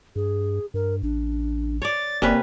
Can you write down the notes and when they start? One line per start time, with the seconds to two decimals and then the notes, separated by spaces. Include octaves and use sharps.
0.16 G2 G#4
0.74 G2 A#4
1.03 A1 D4
1.82 C#5 D5 A6
2.22 F1 C3 A#3 C#4 B4 D5